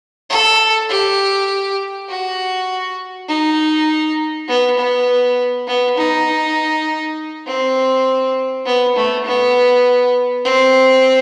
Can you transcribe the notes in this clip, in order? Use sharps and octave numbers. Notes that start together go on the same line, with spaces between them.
A4
G4
F#4
D#4
B3
B3
B3
D#4
C4
B3
A3
B3
C4